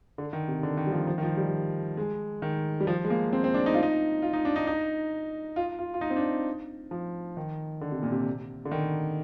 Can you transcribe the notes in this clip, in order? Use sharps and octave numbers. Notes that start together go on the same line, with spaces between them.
D3
D#3
C3
D3
D#3
G3
F3
F3
D#3
F3
G3
G#3
D#3
G3
F3
G#3
A#3
C4
C4
D4
D#4
F4
D#4
F4
D#4
D4
D#4
D#4
F4
F4
F4
D#4
C4
D4
F3
D#3
D3
C3
A#2
C3
D3
D#3